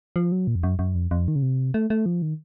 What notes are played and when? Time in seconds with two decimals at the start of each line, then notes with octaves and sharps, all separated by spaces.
0.16 F3
0.32 F#3
0.47 A#2
0.55 F2
0.63 F#2
0.79 F#2
0.95 F2
1.11 F2
1.28 D#3
1.36 C#3
1.42 C3
1.74 A3
1.90 A3
2.06 F3
2.22 D#3